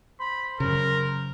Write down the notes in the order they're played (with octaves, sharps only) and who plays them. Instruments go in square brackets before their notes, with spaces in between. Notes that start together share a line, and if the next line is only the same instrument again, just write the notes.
[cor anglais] C5 [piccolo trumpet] B5
[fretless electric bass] F#2 C#3 [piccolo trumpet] A#4